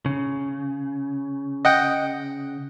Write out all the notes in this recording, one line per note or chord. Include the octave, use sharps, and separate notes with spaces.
C#3
D#5 F#5 G5